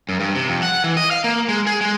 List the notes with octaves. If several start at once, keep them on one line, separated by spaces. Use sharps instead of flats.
F#2
G2
C3
F2
F#5
E3
D#5
F5
A#3
G#3
G#4
G#3